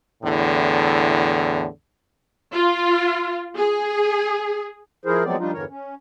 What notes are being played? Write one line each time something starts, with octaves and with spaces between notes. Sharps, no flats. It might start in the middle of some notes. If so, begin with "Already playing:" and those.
E2 A2 D3
F4
G#4
F3 E4 G#4 A#4 C5
F3 F#3 G#3 B3 C4 D5
F3 G3 D4 D#4 F4
E2 G2 D3 E3 A#4 C#5
C#4